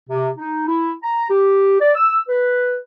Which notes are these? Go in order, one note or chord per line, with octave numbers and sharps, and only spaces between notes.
C3
D#4
E4
A#5
G4
D5
E6
B4